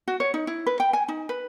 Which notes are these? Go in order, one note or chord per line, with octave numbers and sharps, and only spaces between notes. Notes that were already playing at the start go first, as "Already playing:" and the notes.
F#4
C#5
D#4
E4
B4
G5
G#5
D#4
B4